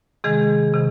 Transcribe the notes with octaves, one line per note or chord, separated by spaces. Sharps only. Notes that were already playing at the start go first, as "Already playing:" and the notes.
C3 D#3 G#3 G#4
C3 D#3